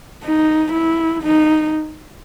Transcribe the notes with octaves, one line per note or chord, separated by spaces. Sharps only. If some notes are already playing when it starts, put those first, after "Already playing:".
D#4
E4
D#4